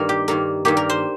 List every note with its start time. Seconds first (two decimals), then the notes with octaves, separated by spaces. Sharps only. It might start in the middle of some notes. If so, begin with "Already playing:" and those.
Already playing: G2 D#3 A#3 A#4
0.09 G4
0.28 G2 D#3 A#3 A#4
0.65 G2 D#3 A#3 G4
0.77 A#4
0.90 C5